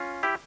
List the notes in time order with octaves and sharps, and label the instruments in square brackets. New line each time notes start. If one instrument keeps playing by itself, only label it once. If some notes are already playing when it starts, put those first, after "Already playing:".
Already playing: [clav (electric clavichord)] C#4 F4
E4 G4